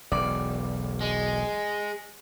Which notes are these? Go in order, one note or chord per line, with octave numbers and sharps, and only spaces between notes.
E1 B1 D5
G#3